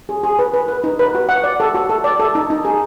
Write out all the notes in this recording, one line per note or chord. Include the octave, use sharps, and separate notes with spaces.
G#4
G#4
B4
B4
B4
D#4
B4
F#4
F#5
D5
A4
F#4
A4
D5
A4
D#4
D#4
G#4